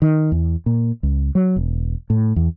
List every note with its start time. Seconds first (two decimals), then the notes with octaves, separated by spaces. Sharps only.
0.02 D#3
0.32 E2
0.66 A#2
1.03 C#2
1.35 F#3
1.56 E1
2.10 A2
2.36 E2